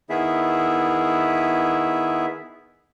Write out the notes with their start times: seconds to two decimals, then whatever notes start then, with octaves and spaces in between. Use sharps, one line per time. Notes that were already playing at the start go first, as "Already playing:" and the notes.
0.10 D#3 B3 E4 G#4 E5